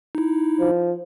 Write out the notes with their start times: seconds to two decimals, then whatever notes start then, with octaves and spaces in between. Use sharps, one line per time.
0.15 D#4 E4
0.60 F3